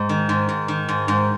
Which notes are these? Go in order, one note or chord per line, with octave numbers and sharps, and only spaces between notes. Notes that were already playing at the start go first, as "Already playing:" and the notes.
Already playing: G#2 G#3
D#3
G#2
G#2
D#3
G#2
G#2